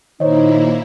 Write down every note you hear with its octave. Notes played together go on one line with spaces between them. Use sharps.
A#2 D#3 A#3 D#4 E4 C5 C#5 D#5